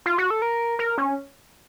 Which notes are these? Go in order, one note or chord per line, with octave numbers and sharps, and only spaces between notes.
F4
F#4
A4
A#4
A#4
C#4